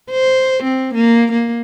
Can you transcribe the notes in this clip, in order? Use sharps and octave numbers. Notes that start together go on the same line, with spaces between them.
C5
C4
A#3
A#3